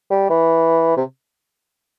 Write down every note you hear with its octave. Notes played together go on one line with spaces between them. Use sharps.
G3
E3
C3